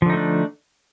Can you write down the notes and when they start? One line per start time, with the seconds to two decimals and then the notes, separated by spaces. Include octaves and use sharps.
0.02 F3
0.06 D3
0.10 D#4
0.13 A3
0.17 D4